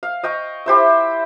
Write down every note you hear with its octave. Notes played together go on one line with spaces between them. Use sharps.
F5
D#5 G5 C#6
E4 G4 C5 E5